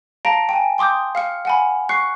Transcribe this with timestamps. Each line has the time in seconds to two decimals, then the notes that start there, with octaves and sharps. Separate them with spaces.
0.25 F5 A5 A#5 A#6 D7
0.49 G5 G#5
0.78 G5 C6 D6 D#6 G6
1.15 F5 F6 C#7
1.45 F#5 G#5 B5
1.89 C#6 F#6 C7 C#7